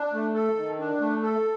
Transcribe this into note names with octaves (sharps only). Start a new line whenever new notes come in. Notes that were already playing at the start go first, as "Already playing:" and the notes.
Already playing: D4
A3
A4
D#3
D4
A3
A4